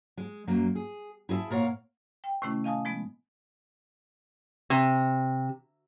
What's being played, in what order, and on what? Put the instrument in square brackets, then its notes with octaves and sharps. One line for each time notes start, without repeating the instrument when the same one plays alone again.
[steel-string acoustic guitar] G#3
F#2 F#3 A#3
G#4
E4 G#4 A#4 E5 A5
A#2 A#4 C#5 F5 F#5
[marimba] G5
A2 C3 D#3 A3 C#4 E4
D#5 F5 G#5 A5 D#6
F3 G#3 B3
[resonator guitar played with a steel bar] C3